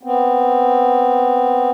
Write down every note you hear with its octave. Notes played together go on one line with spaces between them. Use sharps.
B3 C4